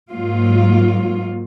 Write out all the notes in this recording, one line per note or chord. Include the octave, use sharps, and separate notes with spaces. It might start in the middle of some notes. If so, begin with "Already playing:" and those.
G#2 F#3 A#3 F4